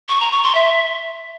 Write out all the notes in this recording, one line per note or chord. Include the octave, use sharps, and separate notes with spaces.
C#6
A#5
C#6
C6
E5